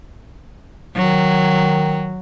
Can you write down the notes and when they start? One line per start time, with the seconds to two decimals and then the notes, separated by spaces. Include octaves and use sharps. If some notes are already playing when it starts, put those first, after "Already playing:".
0.96 D#3 F#3